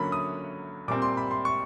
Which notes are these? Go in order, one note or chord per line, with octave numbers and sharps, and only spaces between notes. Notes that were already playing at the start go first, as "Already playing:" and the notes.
Already playing: D3 F#3 A#3 C#4 B5
D#6
A#2 G3 C4 D6
C6
B5
C6
C#6